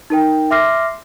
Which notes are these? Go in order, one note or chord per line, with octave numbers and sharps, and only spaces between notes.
D#4 A#4 G5
E5 C6 D6 F6 A#6 C7